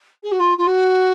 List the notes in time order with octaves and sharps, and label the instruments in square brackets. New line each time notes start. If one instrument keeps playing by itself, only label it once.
[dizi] G#4
F#4
F4
F4
F#4